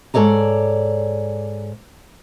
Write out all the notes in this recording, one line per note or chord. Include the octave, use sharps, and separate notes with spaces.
G#2 A4 C#5 D5 A#5